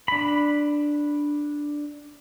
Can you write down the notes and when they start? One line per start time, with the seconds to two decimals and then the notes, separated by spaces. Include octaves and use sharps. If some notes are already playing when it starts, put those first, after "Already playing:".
0.08 D4 B5